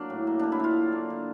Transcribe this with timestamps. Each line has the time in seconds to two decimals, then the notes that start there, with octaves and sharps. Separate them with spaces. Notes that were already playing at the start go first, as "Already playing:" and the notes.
Already playing: F#3 A#3 D4
0.10 A2
0.27 A#3
0.39 D3 D4
0.52 E4
0.59 D3 F4
0.77 F#3
0.92 A#3
1.10 D3